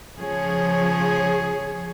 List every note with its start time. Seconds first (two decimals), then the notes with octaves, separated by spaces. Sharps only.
0.17 C#3 F3 G#4 C#5